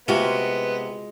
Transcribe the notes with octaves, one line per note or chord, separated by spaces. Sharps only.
C3 G#3 B3 F4 F#4